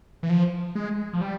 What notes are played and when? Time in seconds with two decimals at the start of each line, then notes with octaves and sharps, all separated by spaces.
0.23 E3
0.30 F3
0.75 G#3
1.13 F3
1.21 G3